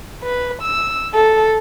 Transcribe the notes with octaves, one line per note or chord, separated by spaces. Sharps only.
B4
E6
A4